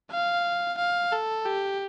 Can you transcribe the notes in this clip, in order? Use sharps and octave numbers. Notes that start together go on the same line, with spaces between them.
F5
F5
A4
G4